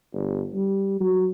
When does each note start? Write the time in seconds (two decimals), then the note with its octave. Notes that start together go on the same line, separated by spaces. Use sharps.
0.13 G1
0.54 G3
1.00 F#3